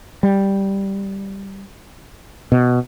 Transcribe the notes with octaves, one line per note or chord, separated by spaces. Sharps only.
G3
B2